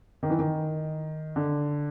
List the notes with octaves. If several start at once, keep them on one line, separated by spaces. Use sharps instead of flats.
D#3
E3
D#3
D3